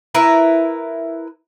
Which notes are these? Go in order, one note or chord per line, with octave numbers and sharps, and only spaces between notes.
E4 A#4 B4